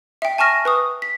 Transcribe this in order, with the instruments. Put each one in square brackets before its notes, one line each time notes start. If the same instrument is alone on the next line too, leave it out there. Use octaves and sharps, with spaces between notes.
[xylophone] E5 G5
G#5 A5 C#6 F6 A#6
B4 C#6 D#6
B6